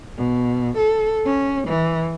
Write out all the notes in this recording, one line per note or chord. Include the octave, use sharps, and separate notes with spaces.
B2
A4
C#4
E3